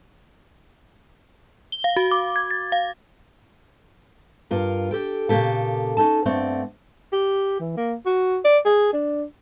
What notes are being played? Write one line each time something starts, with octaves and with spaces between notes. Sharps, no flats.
G7
F5
F#4
D6
G#6
A6
F5
G2 F4 A#4
G4 A4 G5
A#2 C#3 A#3 G4 A4
C#4 D#4 A4 A5
G2 A3 C4 D5 F#5
G4
E3
A#3
F#4
D5
G#4
D4